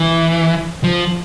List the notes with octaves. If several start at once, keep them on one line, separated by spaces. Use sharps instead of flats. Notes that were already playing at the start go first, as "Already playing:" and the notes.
Already playing: E3
F3